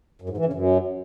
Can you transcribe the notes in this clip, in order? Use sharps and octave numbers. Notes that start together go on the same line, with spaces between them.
F#2
G#2
E3
C#3
F#2